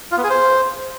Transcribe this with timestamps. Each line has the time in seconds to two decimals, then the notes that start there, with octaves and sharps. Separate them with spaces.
0.12 F4
0.18 B3
0.24 G#4
0.30 C5